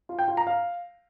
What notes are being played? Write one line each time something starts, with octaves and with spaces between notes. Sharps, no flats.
F4
G5
F4
A#5
F5